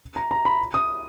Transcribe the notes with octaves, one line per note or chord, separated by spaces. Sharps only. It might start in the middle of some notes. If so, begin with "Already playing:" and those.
A#5
A#5
B5
D#6